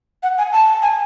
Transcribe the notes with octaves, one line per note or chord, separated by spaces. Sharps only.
F#5
G#5
A5
G#5